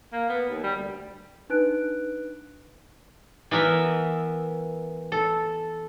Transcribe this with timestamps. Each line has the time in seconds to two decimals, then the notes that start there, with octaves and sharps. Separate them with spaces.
0.13 A#3
0.29 B3
0.48 D#2
0.63 G3
0.77 D2
1.50 D4 D#4 B4 F#6 D7
3.51 E3 B3 A#4 E5
5.12 A4